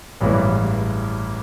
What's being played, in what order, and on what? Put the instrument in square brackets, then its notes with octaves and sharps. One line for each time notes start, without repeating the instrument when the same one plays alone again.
[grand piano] A1 G2 E3 G#3